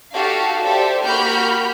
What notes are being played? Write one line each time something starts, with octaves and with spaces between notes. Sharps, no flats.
D#4 F#4 G4 A4 F5
G4 A4 C5 D5 E5
A#3 F#4 G4 B5 F6 G6